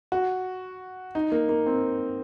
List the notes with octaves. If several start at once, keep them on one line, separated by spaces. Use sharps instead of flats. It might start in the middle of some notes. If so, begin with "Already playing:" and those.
F#4
D#4
A#3
A#3
C4